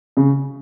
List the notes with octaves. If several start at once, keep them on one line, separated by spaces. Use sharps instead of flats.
C#3